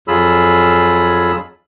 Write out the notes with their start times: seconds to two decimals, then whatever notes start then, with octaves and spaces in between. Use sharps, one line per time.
0.08 F2 F#3 F4 G#4 B5 E6